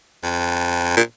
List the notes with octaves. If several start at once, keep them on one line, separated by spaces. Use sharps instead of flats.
F2
A#2